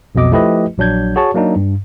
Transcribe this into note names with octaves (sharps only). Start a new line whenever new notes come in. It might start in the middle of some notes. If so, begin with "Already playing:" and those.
B1 F2 B2 D#5 D6
F3 A3 E4 G4 B4 D#5
A#1 F#3 D4 G6 G#6
F#4 G#4 C#5 A5 C#6
F#3 A#3 D4 D#4
G2